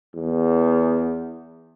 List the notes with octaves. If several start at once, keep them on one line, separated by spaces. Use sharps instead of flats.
E2